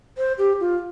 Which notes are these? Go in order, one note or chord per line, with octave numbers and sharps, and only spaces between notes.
C5
G4
F4